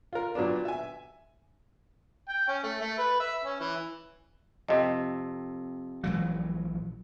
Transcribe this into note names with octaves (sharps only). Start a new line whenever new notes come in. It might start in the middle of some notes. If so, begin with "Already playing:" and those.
F4 A#4
A#2 F#3 B3 D4
E5 G#5
G5
C#4
A3
A3
B4
E5
C#4
E3
F2 C3 D#5
A#1 E3 F#3 G#3